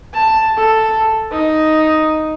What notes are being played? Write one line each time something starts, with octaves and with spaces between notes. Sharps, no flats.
A5
A4
D#4